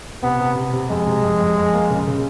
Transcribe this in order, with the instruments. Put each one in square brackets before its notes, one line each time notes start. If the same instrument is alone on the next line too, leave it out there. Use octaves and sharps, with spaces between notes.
[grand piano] C3 [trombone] B3
[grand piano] C3
C3
C3
[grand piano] F2 [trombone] G#3
[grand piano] C3
F2
F2
F2
A#3
C#3
C#3